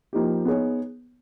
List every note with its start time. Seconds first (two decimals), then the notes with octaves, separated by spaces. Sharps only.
0.13 F3 A#3 D#4 G4
0.45 B3 D#4 G#4 C#5